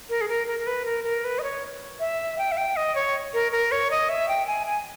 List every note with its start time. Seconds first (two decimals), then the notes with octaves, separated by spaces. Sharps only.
0.10 A#4
0.21 G#4
0.29 A#4
0.47 A#4
0.60 A#4
0.67 B4
0.85 A#4
1.04 A#4
1.24 B4
1.39 D#5
1.43 C#5
2.00 E5
2.38 G5
2.52 E5
2.57 G5
2.76 D#5
2.95 C#5
3.34 A#4
3.52 A#4
3.72 C#5
3.91 D#5
4.09 E5
4.29 G5
4.47 G#5
4.67 G#5